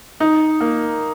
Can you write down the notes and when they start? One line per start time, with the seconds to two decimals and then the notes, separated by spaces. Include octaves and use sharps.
0.20 D#4
0.61 A#3